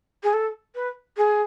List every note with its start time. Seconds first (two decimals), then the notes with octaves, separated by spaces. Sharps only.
0.23 G#4
0.33 A4
0.75 B4
1.17 G#4